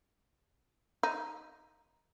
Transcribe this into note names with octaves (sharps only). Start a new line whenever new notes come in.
D#4